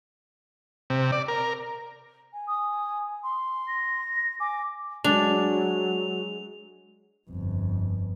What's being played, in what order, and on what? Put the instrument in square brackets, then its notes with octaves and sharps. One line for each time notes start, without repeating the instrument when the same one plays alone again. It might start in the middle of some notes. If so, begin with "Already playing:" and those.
[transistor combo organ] C3
D5
A#4
[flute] G#5
[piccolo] D#6
C6
[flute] A#6
[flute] G#5 [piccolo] D6
[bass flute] F#3 [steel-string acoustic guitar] G#3 [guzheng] D4 [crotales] F7
[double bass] G1 F2